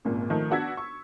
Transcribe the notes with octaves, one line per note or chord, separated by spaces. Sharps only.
G#1 C#2 A#2
D#3 F3 A3
B3 D4 F#4 E6 G#6 B6
C#6